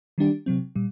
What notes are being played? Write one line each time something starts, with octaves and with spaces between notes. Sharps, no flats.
D#3 G3 D4 G4
C3 F#3 C4
A#2 G3